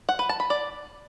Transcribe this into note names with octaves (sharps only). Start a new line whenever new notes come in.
F#5
B4
A5
B5
D5